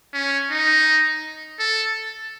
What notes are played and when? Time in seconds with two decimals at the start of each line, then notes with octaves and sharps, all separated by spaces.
0.13 C#4
0.51 D#4
1.59 A4